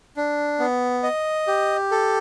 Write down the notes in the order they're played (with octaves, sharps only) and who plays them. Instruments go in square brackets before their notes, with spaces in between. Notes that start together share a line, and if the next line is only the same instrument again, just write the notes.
[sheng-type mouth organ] D4
B3
D#5
G4
A4